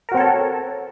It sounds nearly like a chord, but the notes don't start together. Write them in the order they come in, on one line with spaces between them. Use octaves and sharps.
A#4 F#4 C4 C#5 A4